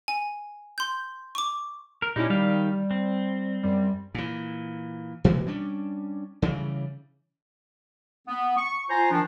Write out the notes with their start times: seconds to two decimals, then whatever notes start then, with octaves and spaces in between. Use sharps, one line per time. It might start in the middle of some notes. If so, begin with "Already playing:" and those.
0.08 G#5
0.78 C6 G6
1.35 C#6 D6
2.02 A#4
2.16 A#2 C#4 D#4 E4 G4
2.30 D#3 G3 G4 F5
2.91 C4
3.63 F#2 G3
4.15 A#2 E3
5.24 B2 E3 G#3 A#3
5.47 G3 C#4 D4
6.42 C#3 E3 G3
8.28 B3
8.57 C#6
8.90 F4 C5 G#5 A#5
9.11 D#3 F3 D4